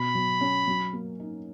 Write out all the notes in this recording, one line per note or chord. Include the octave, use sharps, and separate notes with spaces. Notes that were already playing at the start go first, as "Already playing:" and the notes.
Already playing: B2 B5
F#3
C#4
F#3
A#3
D#4